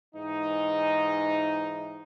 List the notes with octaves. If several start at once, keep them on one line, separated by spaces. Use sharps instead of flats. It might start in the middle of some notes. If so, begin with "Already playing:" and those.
G#2 E3 D#4